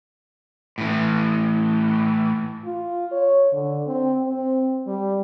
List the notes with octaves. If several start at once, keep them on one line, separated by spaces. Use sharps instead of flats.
A2 E3
F4
C#5
D3
C4
C4
G3